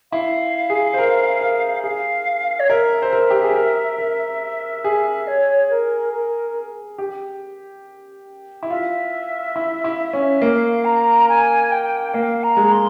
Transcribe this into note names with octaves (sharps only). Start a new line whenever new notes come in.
E4 F5
G#4
C5
A#4
A#4
G#4 F5
C#5
A#4 E5
C5
A#4
G4
G#4
A#4
A#4
G#4
C#5
A#4
A#4
G4
E4
F4 E5
E4
E4
C#4
A#3 F5
A#5
G#5
G5
A#3 F5
A#5
G#3
C6